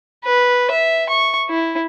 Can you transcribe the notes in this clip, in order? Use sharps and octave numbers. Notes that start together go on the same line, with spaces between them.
B4
E5
C#6
E4